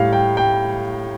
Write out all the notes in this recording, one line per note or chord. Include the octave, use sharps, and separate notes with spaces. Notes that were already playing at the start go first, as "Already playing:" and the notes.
Already playing: A2 G3 F5
G5
G5